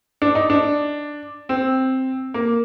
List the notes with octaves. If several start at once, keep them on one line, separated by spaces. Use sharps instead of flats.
D4
D#4
D4
C4
A#3